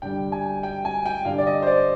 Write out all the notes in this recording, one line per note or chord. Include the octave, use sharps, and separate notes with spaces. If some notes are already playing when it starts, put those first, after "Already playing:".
G2 D3 G3 G5
G#5
G5
G#5
G5
G2 D3 G3 F5
D5
D#5
C5
D5